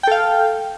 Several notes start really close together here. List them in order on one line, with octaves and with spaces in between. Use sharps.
G5 A4 F5